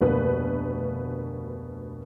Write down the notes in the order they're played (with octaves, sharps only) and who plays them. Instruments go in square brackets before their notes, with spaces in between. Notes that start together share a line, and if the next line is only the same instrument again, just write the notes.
[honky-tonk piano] F1 D2 B2 A#3 B4